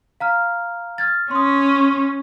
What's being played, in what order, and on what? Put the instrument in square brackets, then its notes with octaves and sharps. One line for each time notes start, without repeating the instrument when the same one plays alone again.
[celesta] F5 A#5 F6
F6 G#6 A6
[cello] C#4 [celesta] C6 D#6